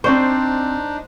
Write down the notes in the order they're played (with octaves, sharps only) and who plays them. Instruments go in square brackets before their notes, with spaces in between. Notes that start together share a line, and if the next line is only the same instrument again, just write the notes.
[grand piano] C4 D5 C#6 [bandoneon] D4 D#4 [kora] C5